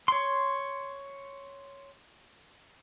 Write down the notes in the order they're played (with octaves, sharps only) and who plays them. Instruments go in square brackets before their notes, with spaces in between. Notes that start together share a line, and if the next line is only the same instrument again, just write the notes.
[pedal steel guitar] C#5 C6